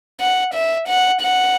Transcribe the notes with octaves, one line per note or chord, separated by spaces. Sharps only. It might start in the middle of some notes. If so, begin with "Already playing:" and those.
F#5
E5
F#5
F#5